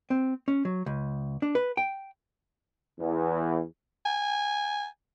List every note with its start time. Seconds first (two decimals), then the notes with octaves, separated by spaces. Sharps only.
0.10 C4
0.48 C#4
0.65 F#3
0.86 C#2
1.42 D4
1.55 B4
1.77 G5
2.99 E2
4.05 G#5